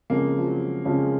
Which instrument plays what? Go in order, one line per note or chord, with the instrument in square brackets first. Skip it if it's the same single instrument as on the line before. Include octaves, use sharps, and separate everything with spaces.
[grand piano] F2 C#3 G#3 C#4 G#4 [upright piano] A#3
[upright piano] F3
F#3
[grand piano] F2 C#3 G#3 C#4 G#4 [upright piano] F3